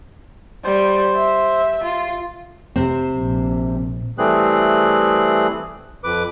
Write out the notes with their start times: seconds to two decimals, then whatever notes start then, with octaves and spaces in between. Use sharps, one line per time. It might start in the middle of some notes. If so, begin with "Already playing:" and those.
0.64 G3 C5
1.15 E5
1.83 F4
2.76 C3 C4
3.18 A#1
4.18 E3 G3 A3 C4 G#4 F#6
6.04 F2 B4 D6